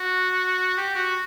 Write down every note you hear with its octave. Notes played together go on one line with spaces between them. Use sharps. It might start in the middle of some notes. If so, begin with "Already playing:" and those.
Already playing: F#4
G4
F#4